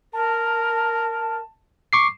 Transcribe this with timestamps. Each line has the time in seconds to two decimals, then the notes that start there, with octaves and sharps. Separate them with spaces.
0.13 A#4 A5
1.93 C#6 D6 C7